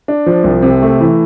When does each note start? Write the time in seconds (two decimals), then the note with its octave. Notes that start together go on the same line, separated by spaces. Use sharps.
0.08 D4
0.26 F3
0.44 C2
0.62 C3
0.82 A3
1.00 E3